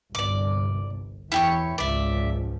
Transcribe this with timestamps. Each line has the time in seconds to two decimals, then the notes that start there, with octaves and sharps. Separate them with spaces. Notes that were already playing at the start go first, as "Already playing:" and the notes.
0.15 G1 C2 D5 D6
1.32 E2 E4 G4 C#5
1.78 G#1 C#2 F3 D5 E5